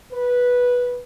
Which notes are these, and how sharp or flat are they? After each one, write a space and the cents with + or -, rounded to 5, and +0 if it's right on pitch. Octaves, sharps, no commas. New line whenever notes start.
B4 -10